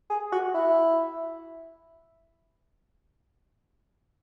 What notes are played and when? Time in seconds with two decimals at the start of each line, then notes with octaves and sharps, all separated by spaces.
0.10 G#4
0.32 F#4
0.55 E4